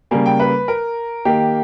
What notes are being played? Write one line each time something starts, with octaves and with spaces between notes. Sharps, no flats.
C#3 G3 A#3 G#5
G5
B4
A#4
D#3 A#3 G4